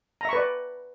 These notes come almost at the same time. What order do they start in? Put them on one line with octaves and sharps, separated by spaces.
A#5 E5 C#6 B4 D5